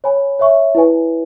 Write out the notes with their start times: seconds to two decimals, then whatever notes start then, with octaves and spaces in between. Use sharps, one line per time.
0.04 C#5 G#5 B5
0.39 C#5 E5 C#6
0.75 E4 B4 G#5